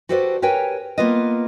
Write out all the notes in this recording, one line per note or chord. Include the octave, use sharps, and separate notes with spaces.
F#4 G4 A4 B4 C5 D5
G4 A#4 B4 C#5 G5 G#5
A#3 B3 F4 B4 D#5